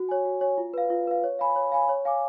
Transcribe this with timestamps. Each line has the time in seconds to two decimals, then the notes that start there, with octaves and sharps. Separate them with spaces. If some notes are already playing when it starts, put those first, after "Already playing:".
Already playing: F#4
0.09 C#5 G#5
0.25 F#4
0.41 C#5 G#5
0.58 F4
0.74 B4 F5
0.90 F4
1.07 B4 F5
1.24 C#5
1.39 F5 G#5 B5
1.56 C#5
1.72 F5 G#5 B5
1.89 C#5
2.05 F5 G#5 D6